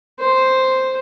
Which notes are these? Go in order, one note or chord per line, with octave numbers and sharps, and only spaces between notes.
C5